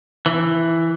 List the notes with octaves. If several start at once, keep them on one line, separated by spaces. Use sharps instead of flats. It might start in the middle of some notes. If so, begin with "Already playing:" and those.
E3